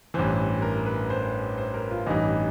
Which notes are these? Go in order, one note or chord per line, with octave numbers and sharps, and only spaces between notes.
A1 G2 E3 C5
A#4
B4
C5
C5
A#4
F4
A1 G2 E3 D#4